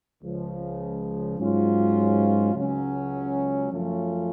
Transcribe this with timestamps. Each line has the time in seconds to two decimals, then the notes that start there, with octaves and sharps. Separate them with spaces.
0.22 C#2 C#3 F3
1.38 G#2 F#3 C#4 F4
2.54 C#2 C#3 F#3 C#4
3.70 F#2 F3 A3 C#4 F4